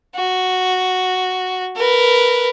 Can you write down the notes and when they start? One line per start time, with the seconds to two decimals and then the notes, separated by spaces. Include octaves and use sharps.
0.16 F#4
1.76 A#4 B4